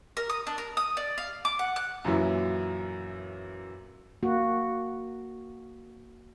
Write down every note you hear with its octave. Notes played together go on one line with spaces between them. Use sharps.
A#4
D#6
D4
A#4
D#6
D5
F5
D6
F#5
F#6
F#2 A#2 E3 F#3 E4
A#3 F#4